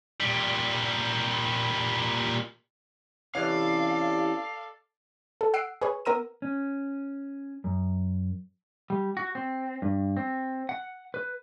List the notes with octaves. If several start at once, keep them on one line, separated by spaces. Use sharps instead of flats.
A#2 G3
C3 E3 C#4 A4 D5 F5
A4
F#5 E6 C7 D7
G#4 B4 C#5
B3 A#4 A#5 E6 D#7
C#4
F#2
G3
F#4
C4
G2
C4
F#5
B4